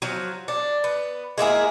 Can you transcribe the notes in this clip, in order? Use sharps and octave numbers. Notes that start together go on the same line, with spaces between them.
F3 F#3
D4
B3
G#3 A#3 E4 G#4